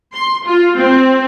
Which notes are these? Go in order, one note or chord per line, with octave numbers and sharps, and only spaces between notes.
C6
F4
C4